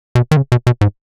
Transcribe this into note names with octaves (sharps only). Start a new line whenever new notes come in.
B2
D#3
C#3
B2
B2
G#2